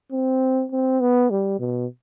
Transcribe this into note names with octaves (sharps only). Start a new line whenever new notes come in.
C4
C4
B3
G3
B2